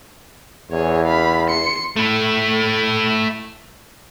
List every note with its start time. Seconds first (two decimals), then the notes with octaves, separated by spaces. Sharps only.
0.71 E2 G#4 C#5
1.06 F5 B5
1.47 C6 C#7
1.96 A3 E4